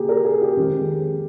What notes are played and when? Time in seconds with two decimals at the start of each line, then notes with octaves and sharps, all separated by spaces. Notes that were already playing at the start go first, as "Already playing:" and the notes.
Already playing: C#3 A#3 G4 G#4
0.09 A#4
0.25 G#4
0.42 G4
0.56 F2 D#3 G#3 C4